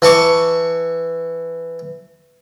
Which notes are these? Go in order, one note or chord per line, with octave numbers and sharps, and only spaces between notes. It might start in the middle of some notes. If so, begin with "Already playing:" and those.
E3 A5 C#6 D6